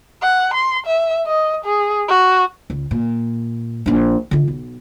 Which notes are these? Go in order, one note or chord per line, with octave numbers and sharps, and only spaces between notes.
F#5
C6
E5
D#5
G#4
F#4
C#2
A#2
A#1 D4
D3 F4
B1